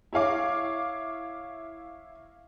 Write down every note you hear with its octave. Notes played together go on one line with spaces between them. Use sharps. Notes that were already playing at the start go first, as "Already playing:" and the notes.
E4 C#5 F5 D6